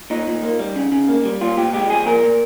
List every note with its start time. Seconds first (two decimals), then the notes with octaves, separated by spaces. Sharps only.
0.10 A#2 D#4
0.27 A#2
0.43 A#3
0.59 G3
0.76 C#3
0.92 C#3
1.09 A#3
1.25 G3
1.41 A#2 F4
1.57 A#2 G4
1.73 G#3 G4
1.90 F3 G#4
2.06 A#2 A#4
2.22 A#2